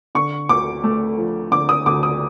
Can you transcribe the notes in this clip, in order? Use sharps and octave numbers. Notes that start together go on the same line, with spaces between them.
D3 C#6
D2 D6
A3
F3
D3 D6
D#6
D2 D6
D#6